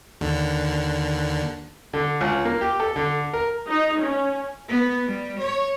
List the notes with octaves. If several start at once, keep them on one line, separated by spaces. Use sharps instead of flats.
D#2 D3
D3
C#2
A#3
G4
A4
D3
A#4
D#4
C#4
B3
G3
C#5